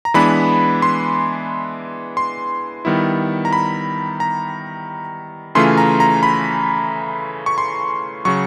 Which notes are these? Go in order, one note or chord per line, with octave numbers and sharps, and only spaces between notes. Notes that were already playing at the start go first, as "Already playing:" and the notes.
A#5
E3 G#3 B3 D4 B5
C6
C6
D#3 G3 B3 E4
A#5
B5
A#5
C#3 E3 A3 C#4 F4 C6
A#5
A#5
B5
C#6
C6
C#3 F#3 C#6